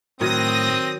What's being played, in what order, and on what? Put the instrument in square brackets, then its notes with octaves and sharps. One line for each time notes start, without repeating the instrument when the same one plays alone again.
[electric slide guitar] A2 [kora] D#3 F#3 F#4 [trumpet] C4 [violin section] D#6 A#6